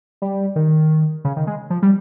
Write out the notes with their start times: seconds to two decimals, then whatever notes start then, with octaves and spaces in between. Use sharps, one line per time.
0.22 G3
0.56 D#3
1.25 C#3
1.36 D#3
1.47 G#3
1.70 F3
1.82 G3